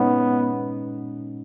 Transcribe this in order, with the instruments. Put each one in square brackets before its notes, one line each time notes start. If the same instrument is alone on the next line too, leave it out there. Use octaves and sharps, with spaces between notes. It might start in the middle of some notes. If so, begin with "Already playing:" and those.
Already playing: [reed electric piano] A#2 G#3 C#4 D#4 [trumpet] B3